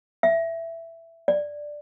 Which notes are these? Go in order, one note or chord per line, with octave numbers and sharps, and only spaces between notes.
E5
D5